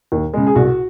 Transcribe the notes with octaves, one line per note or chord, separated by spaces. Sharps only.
D#2
C#3 G#3
G#4
C2 F#4